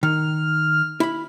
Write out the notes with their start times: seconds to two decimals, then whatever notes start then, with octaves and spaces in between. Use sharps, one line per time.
0.03 D#3 F6
1.00 E4 B5